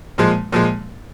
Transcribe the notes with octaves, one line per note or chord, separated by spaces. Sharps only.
A#2 F3 G#3
A#2 F3 G#3